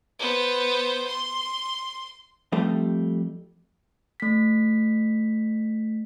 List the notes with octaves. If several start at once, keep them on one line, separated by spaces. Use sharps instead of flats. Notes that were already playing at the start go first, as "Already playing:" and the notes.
B3 C5
C6
F2 G3 A3 G4
A3 B6